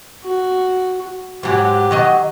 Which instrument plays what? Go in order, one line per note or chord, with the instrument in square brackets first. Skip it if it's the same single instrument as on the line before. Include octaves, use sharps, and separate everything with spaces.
[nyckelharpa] F#4
[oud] G#2 F#3 [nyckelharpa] G4
[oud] D#3 F#3 D#5